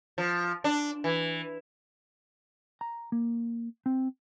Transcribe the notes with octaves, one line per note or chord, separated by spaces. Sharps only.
F3
D4
E3
A#5
A#3
C4